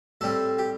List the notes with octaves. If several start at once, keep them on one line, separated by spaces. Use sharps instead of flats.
A2 G3 C4 A4
G4